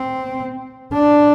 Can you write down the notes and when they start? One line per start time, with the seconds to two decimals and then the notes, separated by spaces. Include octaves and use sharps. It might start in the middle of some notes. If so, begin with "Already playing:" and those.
Already playing: C4
0.93 D4